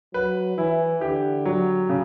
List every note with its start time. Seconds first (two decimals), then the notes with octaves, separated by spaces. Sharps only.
0.14 F#3 B4
0.57 E3 E4
1.01 D3 G4
1.45 F#3
1.89 C#3